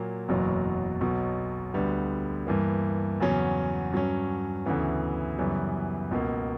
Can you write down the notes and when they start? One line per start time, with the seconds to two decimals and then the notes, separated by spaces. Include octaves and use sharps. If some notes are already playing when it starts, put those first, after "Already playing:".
Already playing: A#2 F#3 A#3
0.28 F#1 E2 B2 F#3
1.01 B1 B2 F#3
1.74 D2 D3 G3 B3
2.47 G2 E3 A#3
3.20 E2 C#3 F#3 C#4
3.92 G2 F#3 C#4
4.66 D2 C#3 E3 B3
5.39 F#2 C#3 E3 G3 B3
6.11 C#2 B2 A#3